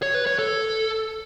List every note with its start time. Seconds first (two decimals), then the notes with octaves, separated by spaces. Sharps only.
0.03 C#5
0.14 B4
0.27 C#5
0.39 A4